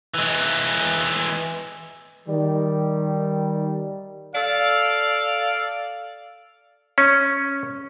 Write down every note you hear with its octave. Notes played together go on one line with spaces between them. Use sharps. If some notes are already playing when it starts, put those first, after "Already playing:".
E3 G#3
D#3 G3
A4 D5 F5
C#4